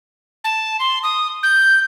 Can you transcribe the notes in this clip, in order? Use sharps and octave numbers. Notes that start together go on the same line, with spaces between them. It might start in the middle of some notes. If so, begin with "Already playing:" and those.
A5
C6
D#6
G6